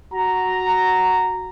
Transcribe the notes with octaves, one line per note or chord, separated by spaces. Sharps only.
F#4 A#5